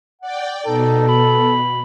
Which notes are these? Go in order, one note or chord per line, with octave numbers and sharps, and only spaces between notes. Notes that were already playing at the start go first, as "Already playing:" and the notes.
D5 F#5 G5
B2 D#4 A4
B5